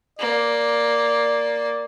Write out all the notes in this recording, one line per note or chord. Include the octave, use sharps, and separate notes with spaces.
A#3 D5